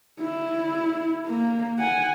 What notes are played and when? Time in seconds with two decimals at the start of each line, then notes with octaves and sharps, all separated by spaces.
0.21 E4
1.26 A#3
1.79 F#5 G#5